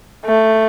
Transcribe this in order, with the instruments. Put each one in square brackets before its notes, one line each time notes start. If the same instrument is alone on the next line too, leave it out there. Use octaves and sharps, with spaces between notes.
[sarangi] A3